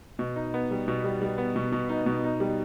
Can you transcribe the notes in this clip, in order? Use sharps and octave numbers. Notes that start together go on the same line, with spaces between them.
B2
D#4
B3
G3
B2
G3
G3
B3
B2
B2
D#4
B2
D#4
G3